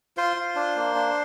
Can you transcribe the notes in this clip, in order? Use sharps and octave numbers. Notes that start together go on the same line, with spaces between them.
F4 C5 C6
F4
D4
A#3
D4